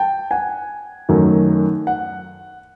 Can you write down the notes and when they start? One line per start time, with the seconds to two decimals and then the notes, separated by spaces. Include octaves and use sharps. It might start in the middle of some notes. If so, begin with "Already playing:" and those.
Already playing: G5 A5
0.31 F#5 G#5
1.09 F#2 D#3 F#3 A3
1.87 F#5